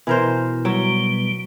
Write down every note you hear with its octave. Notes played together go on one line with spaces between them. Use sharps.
B2 E3 A#4 C5
F#3 G3